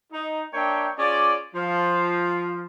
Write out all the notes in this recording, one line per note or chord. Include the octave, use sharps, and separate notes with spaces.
D#4
A#3 D4 C#5 E5 G5
C#4 F4 G#4 D5
F3